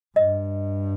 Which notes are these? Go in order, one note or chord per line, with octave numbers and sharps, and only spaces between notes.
G2 D#5